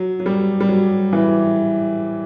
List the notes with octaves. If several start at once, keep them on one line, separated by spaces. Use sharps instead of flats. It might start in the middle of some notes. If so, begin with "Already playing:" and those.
Already playing: F#3
F#3
G3
G3
F#3
E3